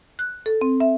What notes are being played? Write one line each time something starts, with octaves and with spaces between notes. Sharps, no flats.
F#6
A4
C4
E5